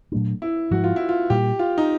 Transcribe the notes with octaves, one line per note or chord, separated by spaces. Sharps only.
A#2 F#3 A3 D4
E4
G#2 F3 G#3 F#4
F4
E4
F4
A#2 G3 A#3 G4
F4
D#4